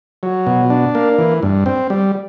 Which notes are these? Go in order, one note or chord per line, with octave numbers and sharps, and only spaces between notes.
F#3
B2
D4
A#3
E3
G2
C4
G3